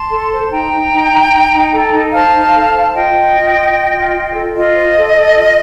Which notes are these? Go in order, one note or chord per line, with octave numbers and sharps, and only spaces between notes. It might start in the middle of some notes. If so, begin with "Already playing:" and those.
Already playing: A5 C6
A4
C5
D#4 G5 A#5
D#4
D#4
D#4
D#4
D#4
A4
D#4
C5 F5 A5
D#4
A4
C5
F4 D#5 G5
F4
F4
F4
F4
F4
F4
A4
F4 D#5
C5
A4
A4
F4